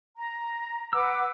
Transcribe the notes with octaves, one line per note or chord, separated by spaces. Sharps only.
A#5
B4 F#5 D6 E6